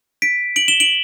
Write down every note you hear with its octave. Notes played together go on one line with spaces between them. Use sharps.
B6 D7
D7 F#7
E7 G7
D7 F#7